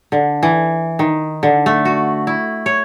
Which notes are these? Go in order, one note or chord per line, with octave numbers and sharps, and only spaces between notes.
D3
E3
D#3
D3
A3
F#4
E4
C#5